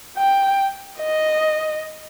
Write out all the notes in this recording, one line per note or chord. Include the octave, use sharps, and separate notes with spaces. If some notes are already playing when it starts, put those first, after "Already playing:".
G5
D#5